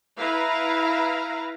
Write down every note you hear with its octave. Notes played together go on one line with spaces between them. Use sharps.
E4 B4 F5 A#5